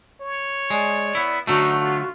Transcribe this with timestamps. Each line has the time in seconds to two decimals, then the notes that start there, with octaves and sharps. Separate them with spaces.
0.21 C#5
0.70 G#3 D5
1.15 B3 E4
1.47 D3 F#3 A3 D#4 F#4
1.80 F4